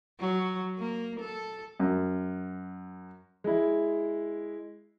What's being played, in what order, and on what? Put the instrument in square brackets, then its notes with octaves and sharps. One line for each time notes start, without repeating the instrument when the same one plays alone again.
[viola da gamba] F#3
A#3
A4
[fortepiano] F#2
[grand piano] G#3 E4